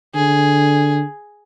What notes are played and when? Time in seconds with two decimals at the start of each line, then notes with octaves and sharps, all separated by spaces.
0.15 D3 G#4